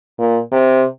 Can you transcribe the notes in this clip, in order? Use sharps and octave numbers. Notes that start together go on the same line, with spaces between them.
A#2
C3